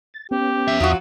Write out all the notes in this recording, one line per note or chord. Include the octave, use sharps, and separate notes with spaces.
A6
B3 C#4 G4
F2 E5
E2 F#3 F4 F#4 D#6